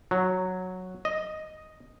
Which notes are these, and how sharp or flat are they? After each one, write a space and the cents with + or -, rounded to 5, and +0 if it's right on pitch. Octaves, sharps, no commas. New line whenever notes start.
F#3 -5
D#5 +0